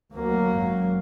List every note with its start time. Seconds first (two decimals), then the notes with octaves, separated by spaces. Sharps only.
0.13 D2 F#3 A#3
0.49 G#1 F#2